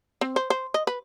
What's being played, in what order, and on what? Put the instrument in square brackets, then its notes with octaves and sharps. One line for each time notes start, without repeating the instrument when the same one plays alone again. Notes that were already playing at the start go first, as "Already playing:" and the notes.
[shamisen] C4
C5
C5
D#5
B4